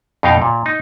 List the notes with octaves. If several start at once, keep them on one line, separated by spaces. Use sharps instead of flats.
F2 B2 D#4 F5 G5
A#2
D#4